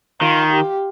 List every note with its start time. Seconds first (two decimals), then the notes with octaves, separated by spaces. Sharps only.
0.20 D#3 F4
0.52 G4